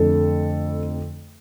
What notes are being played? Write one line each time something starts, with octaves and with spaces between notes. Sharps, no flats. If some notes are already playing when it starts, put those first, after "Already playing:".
Already playing: F2 D3 A3 A4